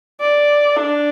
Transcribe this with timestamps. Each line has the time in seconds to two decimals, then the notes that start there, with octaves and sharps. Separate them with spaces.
0.20 D5
0.76 D4